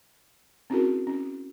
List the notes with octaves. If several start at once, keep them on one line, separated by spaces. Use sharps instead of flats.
C4 C#4 E4 F#4 G#4 A#4
C#4